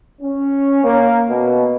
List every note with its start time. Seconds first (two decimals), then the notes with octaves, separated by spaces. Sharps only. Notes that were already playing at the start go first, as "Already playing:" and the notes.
0.21 C#4
0.84 A#3
1.28 B2